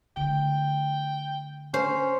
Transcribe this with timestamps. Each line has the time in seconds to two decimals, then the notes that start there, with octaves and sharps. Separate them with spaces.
0.17 D3 A3 G5
1.74 C#4 C5